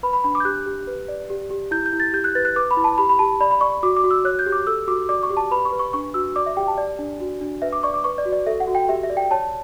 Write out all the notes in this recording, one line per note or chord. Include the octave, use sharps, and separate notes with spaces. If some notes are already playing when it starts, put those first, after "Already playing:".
B4 B5
B5
D4 B5
D6
G6
G4 F#6
G4
B4
D5
G4
G4
E4 G6
G6
E4
A6
G4 G6
F#6
B4 A6
F#6
B4 D6
B5
E4
A5
G4 B5
B5
G4 A5
D5 B5
B5
D5 C#6
F#4 D6
D6
F#4
E6
C#5 F#6
G6
G4
D6
A4 E6
F#4 D6
D5 D6
C#6
G4
A5
B4 B5
C#6
B4
C#6
D4 C#6
F#4 E6
D5 D6
E5
G4 G5
A5
D5
D4
F#4
D4
B4 E5
D6
D5 C#6
D6
B4 C#6
D5
F#4
D5
A4 E5
F#5
F#4
G5
G4 E5
E5
D5
G5
C#5 A5